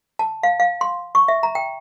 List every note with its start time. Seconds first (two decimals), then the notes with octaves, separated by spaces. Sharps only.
0.19 A5
0.43 F5
0.60 F5
0.81 C6
1.15 C#6
1.28 E5
1.43 A#5
1.55 G5